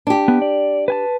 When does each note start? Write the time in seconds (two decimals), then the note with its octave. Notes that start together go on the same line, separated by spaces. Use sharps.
0.07 D4 G4
0.28 B3
0.42 D5
0.88 B4 G#5 A5